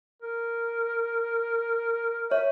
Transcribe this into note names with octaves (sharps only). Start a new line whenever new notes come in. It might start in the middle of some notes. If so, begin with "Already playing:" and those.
A#4
C#5 E5